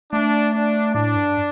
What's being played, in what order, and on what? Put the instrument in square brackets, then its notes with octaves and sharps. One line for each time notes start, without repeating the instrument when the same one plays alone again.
[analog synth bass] A3 [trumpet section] D4
[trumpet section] D4
[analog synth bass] A2 [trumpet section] D4
[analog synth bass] G2